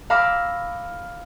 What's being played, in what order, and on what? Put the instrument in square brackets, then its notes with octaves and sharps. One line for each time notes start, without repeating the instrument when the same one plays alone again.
[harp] F5 A#5 B5 D6 E6